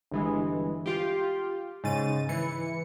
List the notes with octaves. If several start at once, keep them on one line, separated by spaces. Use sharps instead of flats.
G1 E3 G#3
F4 G4
G#2 C#3 A6 D#7
E3 C#7